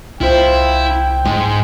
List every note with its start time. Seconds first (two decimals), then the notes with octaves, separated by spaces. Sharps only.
0.21 C2 E4 F4 C5 G5
1.25 G#2 G#3 C6